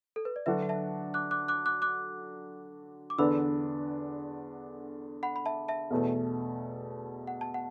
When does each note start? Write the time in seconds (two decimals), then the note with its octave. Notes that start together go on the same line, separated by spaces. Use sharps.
0.16 A4
0.25 B4
0.36 D5
0.46 D3 F#3 D4 F#4 B4 E5
0.62 F#5
0.69 E5 A5
1.14 D6 F#6
1.31 D6 F#6
1.48 D6 F#6
1.66 D6 F#6
1.82 D6 F#6
3.10 D6
3.18 E2 D3 B3 D4 B5 E6
5.23 F#5 B5
5.36 B5
5.46 E5 A5
5.68 E5 A5
5.91 E2 B2 A3
7.27 F#5
7.41 A5
7.54 F#5